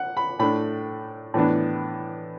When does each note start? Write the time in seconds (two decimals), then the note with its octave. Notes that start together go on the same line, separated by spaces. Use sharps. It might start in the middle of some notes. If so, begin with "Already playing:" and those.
Already playing: F#5
0.17 B5
0.39 A2 A3 D4 B5
1.34 A2 E3 B3 D4